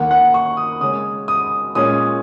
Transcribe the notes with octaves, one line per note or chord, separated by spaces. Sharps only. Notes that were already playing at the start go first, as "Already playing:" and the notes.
Already playing: D#2 D#3 A#3 F#5
F#5
C#6
D#6
C#3 G#3 C#4 D#6
D#6
A#2 G#3 C#4 D#6